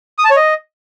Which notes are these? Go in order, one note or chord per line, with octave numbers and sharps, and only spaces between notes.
D#6
A5
C#5
D#5